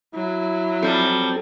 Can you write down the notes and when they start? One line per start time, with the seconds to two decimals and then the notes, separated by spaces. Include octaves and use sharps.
0.14 F#3 E4
0.83 F3 G3 C4 A4